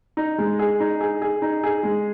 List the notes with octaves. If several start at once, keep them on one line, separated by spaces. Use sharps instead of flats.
D#4
G#3
G#4
D#4
G#4
G#4
D#4
G#4
G#3